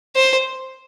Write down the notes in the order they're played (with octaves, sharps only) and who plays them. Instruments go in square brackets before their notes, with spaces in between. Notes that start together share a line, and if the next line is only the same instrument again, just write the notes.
[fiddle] C5